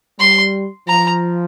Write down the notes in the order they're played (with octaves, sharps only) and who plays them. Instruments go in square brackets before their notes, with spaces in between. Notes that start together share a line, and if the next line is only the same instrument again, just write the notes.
[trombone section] G3 [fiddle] C6
[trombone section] F3 [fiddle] A#5